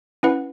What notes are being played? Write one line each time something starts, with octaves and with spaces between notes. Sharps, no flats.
C#4 E4 B4 F#5